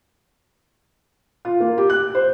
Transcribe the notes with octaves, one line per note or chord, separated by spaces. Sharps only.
F4
A#3
G4
F#6
C5